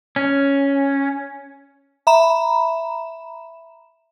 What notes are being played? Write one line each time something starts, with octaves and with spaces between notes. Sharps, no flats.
C#4
E5 A#5 B5 E7